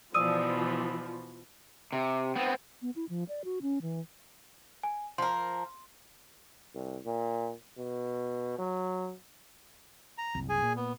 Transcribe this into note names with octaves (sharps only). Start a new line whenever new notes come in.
B2 E3 F3 D5 G#5 D#6 E6 D#7
C3
B3 C4
B3
E4
F3
D5
F#4
C#4
E3
G#5
F3 A#4 C6
C2
A#2
B2
F#3
A#5
F#1 C2
G#4 G#5
A#2
B3